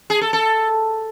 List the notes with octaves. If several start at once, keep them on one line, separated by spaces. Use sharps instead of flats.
G#4
A4
A4